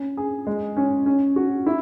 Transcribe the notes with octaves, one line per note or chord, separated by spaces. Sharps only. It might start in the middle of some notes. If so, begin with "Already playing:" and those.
Already playing: C#4
G#4
G#3
C#4
C#4
F#4
E4